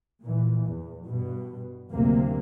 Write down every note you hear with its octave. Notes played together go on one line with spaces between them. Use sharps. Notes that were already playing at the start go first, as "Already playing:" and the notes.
A#2 E3
E2
G2 B2
F#1 D2 C3 A#3